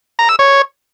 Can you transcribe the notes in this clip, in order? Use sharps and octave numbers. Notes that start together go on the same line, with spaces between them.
A#5
E6
C#5